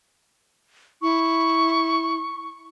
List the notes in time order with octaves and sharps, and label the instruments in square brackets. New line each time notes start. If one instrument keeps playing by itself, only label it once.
[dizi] E4 [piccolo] C#6